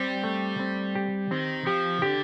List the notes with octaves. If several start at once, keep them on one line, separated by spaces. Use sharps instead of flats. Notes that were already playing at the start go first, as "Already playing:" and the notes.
Already playing: G3 C4
A3
C4
G4
D#3 C4
F3 G4
D3 G4